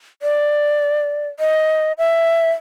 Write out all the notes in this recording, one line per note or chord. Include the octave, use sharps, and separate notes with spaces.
D5
D#5
E5